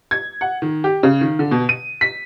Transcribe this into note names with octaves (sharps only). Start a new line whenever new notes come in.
G#6
F#5
D#3
G4
C#3
D#3
D3
B2
D#7
B6